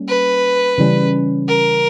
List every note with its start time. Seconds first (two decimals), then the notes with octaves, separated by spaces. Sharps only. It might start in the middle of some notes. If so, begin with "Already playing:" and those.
Already playing: G3 A#3 C#4
0.08 B4
0.78 C#3 E3 G3 C#4
1.49 A#4